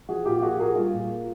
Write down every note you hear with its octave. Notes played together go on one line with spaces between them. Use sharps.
F3 F#4 G#4
A#2 F4 G4
G4
A#3 F#4 G#4
A#2 G#4 A#4
G3 F4
A#2
A#3